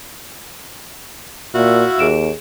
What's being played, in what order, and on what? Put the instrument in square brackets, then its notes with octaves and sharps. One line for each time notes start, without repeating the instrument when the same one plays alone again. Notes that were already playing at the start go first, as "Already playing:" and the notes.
[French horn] A#2 [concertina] E4 E5 F5 [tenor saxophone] F#4
[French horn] D#2 [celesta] G#4 D7 E7